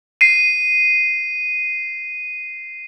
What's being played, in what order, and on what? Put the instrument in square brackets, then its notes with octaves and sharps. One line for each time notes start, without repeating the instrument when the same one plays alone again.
[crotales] C7 D#7